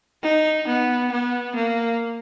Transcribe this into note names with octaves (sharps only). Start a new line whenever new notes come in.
D#4
B3
B3
A#3